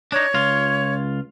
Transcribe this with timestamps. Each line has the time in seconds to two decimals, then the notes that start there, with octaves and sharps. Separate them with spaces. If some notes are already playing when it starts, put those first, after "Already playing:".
0.12 D4 D#4 C#5
0.34 C#2 F4